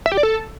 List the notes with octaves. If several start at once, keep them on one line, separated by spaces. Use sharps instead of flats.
E5
G4
D5
A4